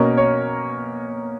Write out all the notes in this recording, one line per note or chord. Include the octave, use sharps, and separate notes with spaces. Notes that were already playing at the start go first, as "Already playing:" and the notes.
Already playing: B2 A#3 C#4 A#4
C#5